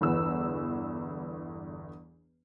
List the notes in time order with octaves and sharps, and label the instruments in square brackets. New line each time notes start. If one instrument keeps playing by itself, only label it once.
[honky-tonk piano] G1 E2 B3 E6